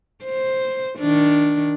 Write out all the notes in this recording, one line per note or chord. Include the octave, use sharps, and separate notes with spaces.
C5
D#3 D4